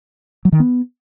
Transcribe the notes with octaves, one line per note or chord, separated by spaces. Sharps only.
F#3
D#3
B3